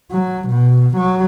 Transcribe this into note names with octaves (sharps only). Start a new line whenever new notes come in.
F#3
B2
F#3